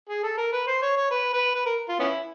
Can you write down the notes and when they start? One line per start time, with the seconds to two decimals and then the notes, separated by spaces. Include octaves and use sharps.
0.09 G#4
0.23 A4
0.37 A#4
0.53 B4
0.67 C5
0.82 C#5
0.97 C#5
1.11 B4
1.33 B4
1.55 B4
1.66 A#4
1.89 F4
1.99 B3 C#4 E4